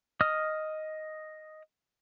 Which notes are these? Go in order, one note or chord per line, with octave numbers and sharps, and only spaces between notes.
D#5 D#6 F6